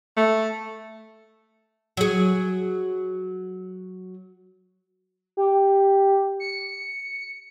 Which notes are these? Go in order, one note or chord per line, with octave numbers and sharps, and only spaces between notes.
A3
F#3 G#4
G4
C#7